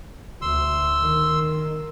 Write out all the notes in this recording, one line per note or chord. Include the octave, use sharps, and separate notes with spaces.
D2 C6 E6
D#3